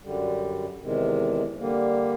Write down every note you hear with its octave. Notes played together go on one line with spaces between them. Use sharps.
F#2 D3 G3
E2 C3 D#3 G#3
D3 G3 A#3